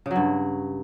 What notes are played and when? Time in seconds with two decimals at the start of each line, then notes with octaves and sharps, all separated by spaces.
0.06 C#3
0.11 F#3
0.16 G2